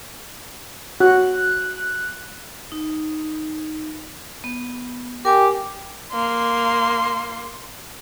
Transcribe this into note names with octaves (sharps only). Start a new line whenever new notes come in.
F#4 F#6
D#4
B3
G4 A#4 G#5 D6
A#3 C6